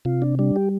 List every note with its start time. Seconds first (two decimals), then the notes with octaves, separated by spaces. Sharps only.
0.05 C3 F4
0.22 D4
0.39 G3 D4
0.56 G4